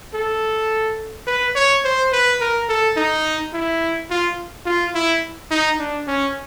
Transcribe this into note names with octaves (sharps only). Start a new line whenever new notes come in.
A4
B4
C#5
C5
B4
A#4
A4
D#4
E4
F4
F4
E4
D#4
D4
C#4